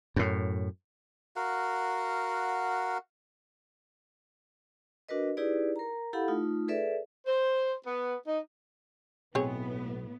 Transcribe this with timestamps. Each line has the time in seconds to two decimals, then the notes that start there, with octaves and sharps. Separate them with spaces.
0.16 F#2 A2
1.36 F#4 A#4 F5 F#5
5.09 D4 F#4 A#4 B4 D#5
5.37 D#4 E4 G4 G#4 B4 D5
5.76 A#4 A#5
6.13 E4 G4 A4 F5 F#5 B5
6.28 A3 D#4 F4
6.68 G#4 A4 B4 D5 E5
7.26 C5
7.86 B3
8.27 D#4
9.35 B1 A2 B3 C4 G#4 C#5